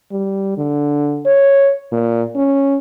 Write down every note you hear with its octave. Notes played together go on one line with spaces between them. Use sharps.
G3
D3
C#5
A#2
C#4